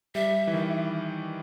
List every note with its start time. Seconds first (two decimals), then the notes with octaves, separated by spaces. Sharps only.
0.15 G3 E5
0.47 E3
0.53 D#3